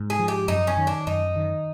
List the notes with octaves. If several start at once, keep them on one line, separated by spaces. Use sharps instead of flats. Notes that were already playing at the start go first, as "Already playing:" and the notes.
Already playing: G#2
G#4
F3
G4
F#2 D#4
C#4
D#3
D4
F#2 D#4
D#3